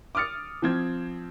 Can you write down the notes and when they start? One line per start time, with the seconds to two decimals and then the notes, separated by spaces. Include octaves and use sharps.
0.15 D6 D#6 F6 A6 C#7
0.62 F3 C4 G#6